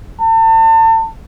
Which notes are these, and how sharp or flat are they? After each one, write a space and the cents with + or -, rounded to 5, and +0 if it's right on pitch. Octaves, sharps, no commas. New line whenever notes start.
A5 +35